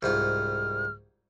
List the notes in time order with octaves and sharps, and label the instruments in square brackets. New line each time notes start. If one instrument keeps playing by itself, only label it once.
[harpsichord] C2 G#2 F4 [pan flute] F6